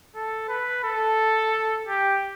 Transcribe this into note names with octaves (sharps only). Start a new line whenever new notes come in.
A4
B4
A4
G4